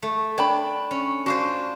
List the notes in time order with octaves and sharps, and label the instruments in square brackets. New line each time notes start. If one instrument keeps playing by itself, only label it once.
[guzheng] A3
[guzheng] D4 [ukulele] C#5 G5 B5
[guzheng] C#4
[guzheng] D4 F4 C5 [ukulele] F#4